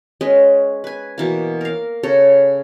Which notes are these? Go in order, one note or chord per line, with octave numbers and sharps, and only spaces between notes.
G#3 C#4 B4 D#5
B4 G#5
B2 E3 A#3
A#4 F5
C#3 A4 C#5 A#5